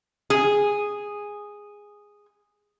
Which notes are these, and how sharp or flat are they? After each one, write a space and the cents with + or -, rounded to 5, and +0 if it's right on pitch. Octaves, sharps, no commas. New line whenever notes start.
G#4 -10